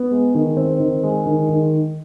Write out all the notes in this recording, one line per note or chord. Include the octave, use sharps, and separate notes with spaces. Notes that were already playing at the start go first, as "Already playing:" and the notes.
Already playing: B3
G#3
D#3
C4
D#3
G#3
D#3
D#3